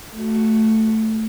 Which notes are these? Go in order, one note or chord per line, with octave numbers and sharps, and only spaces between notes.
A3 F#4